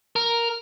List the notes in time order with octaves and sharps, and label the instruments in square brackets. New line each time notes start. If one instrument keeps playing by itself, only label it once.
[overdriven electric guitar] A#4